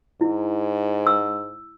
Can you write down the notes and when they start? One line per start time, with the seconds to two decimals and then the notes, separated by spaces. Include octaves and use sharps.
0.21 G#2 E4
1.07 E6